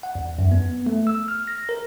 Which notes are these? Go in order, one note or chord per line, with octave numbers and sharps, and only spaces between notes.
F#5
E2
F#2
B3
A3
E6
F6
A#6
A#4